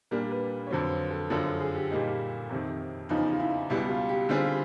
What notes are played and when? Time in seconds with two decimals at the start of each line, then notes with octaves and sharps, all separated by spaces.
0.11 A#2 G3 A#3 D4 A#4
0.31 B4
0.67 C#5
0.70 F2 D3 F#3 C5
1.10 A4
1.30 F#2 D3 F3 A#4
1.45 A4
1.60 G#4
1.76 G4
1.91 A#2 G3 A#3 D#4
2.49 F2 C3 D#3
3.09 E2 C#3 F3 D#4
3.33 F4
3.40 E4
3.70 C#2 B2 G3 E4
3.89 F4
4.09 G4
4.29 D3 G3 C4 F4 G#4